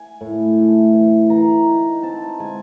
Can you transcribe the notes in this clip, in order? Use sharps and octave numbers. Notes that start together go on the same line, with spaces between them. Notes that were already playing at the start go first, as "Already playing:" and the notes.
Already playing: G#5
A2
A3
E3
E3 A#5
D#4
C4 A5
G#3 G#5